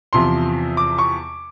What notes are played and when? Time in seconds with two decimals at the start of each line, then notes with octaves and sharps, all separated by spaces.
0.13 E2 C3 F3 C6
0.77 D6
0.98 C#6